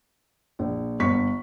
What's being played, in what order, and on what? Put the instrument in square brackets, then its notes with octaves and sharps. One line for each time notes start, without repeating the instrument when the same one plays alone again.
[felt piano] A#1
G1 C#6 B6